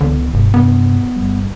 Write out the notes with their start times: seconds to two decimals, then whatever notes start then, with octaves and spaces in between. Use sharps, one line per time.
0.01 C#2 D3 E3 B3
0.34 F1 G2 B2
0.54 G2 C3 B3 D4
1.16 G1 G3